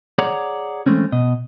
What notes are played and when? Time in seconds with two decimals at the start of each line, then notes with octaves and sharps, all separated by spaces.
0.18 G#4 C#5 D5 F#5 A#5
0.86 E3 G#3 A3 C4 C#4
1.12 B2 D#5